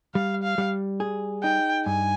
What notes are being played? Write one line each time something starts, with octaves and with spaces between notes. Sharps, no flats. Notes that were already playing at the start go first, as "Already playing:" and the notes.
G3 F5
F5
G3
G#4
D#4 G5
G2 G#5